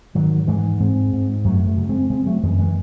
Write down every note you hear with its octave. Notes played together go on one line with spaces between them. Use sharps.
G#2 D#3 F#3
G#2 E3 G#3
G#2 G#3 C4
G#2
F#2 F#3 A3
F#3 A3
C#3
G#3 C4
C#3 G#3 C4
F#3 A3
F#2 E3 G#3
E3 G#3